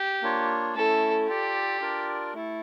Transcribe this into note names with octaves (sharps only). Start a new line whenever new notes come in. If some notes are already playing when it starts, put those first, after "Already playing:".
Already playing: G4
A#3 D4 F4 C#5
A3 C#4 E4 A4
F4 G4 A4 D5
D4 F4 A#4 D5
A3 E4 A4